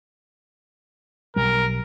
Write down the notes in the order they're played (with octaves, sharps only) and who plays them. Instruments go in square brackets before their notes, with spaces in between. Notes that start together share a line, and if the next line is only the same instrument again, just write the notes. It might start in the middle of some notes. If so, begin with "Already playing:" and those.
[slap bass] B1 G3 [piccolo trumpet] A#4